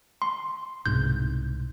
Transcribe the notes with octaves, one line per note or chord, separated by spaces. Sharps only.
C6
C2 G#2 B2 G6